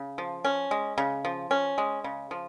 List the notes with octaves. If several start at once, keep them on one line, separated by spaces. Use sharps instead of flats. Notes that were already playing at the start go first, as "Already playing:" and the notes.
Already playing: C#3
F3
C#4
G#3
C#3
F3
C#4
G#3
C#3
F3